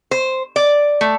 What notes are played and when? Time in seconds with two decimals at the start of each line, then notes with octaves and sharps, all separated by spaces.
0.11 C5
0.56 D5
1.01 A3